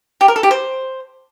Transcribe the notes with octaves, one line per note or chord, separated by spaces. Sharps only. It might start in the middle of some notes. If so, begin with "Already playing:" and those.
G4
A#4
A4
G4
C5